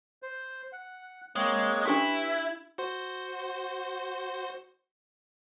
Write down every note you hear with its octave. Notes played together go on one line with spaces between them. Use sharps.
C5
F#5
G#3 A#3 C4 C#5
D4 E4 G4 B4 C6
F#4 C5